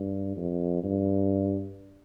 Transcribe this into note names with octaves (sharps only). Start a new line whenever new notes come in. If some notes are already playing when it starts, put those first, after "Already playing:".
Already playing: G2
F2
G2